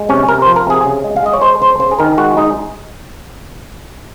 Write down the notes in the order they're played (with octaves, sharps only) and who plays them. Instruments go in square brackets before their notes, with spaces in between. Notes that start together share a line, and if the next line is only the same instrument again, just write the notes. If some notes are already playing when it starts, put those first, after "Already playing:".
Already playing: [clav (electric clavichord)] G#3
C3 C#4
C3 A#4
F3 C5
A#4
C3 G#4
C#3
G#3
F5
G#3 D#5
C#5
G#3 C5
C#3 C5
C#3 C5
G#4
D#3 A#4
G#3 F#4
G#3 D#4